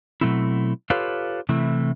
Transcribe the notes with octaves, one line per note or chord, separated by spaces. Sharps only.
B2 F#3 A3 C4 E4
F4 G4 A4 B4 C#5 F5
C3 E3 A3 E4